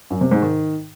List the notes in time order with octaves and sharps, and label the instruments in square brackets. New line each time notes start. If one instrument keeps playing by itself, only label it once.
[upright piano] F#2
C3
G#2
D#3